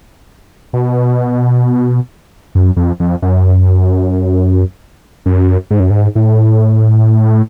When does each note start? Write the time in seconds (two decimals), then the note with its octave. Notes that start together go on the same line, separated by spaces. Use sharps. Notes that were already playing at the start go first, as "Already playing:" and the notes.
0.73 B2
2.55 F#2
2.76 F2
3.00 F2
3.22 F#2
5.26 F#2
5.71 G#2
5.80 F#2
5.90 G#2
6.15 A2